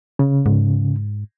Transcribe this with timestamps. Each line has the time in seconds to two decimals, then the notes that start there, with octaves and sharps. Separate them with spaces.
0.19 C#3
0.46 G#2